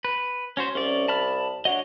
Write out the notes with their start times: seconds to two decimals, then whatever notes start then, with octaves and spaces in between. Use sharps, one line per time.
0.05 B4
0.57 C#4 F#4 C5
0.75 C2 C#4 D5
1.08 A5 B5 F6
1.65 D4 F#4 C#5 D#5